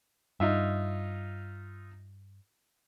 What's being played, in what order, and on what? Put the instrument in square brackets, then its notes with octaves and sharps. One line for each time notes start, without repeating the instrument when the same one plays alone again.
[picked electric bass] G2 [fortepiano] D#4 F4 E5